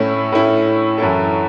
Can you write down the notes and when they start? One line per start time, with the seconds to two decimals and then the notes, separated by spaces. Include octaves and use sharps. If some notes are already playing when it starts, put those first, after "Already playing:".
Already playing: A2 A3 C#4 E4
0.32 A2 A3 C#4 E4
0.98 F#2 E3 C#4 E4 A4